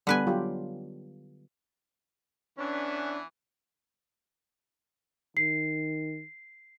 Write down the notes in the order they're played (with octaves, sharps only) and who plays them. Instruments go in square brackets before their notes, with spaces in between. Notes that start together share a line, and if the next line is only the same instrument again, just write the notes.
[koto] D3 B4 G#5 [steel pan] G3 B3
[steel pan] F#3 F4 G4
[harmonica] E3 B3 E5 [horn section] C#4 D4
[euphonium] D#3 [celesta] C7